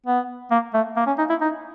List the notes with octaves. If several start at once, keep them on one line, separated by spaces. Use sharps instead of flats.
B3
A#3
A3
A#3
C#4
D#4
E4
D#4